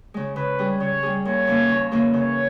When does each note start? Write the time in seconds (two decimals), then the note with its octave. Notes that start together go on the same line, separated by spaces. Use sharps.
0.14 C#3 G#3
0.36 C#3 B4
0.59 G3 C#4 G#4
0.80 C#3 C#5
1.03 G3 C#4 G#4
1.25 D#2 C#5
1.47 C#3 E3 A#3 C#4
1.69 D#2
1.91 C#3 E3 A#3 C#4
2.14 C#3 C#5